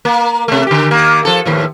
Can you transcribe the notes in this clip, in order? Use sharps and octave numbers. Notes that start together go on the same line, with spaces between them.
A#3
C3 A3
D3 G4
D#3 A#3
F3 A4
D#2 A2 F3